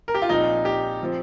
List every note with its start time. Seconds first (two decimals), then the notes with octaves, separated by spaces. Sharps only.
0.08 A#4
0.14 G4
0.22 F4
0.29 A#1 A#2 F3 C4 D#4
0.65 G4
1.03 F3 C4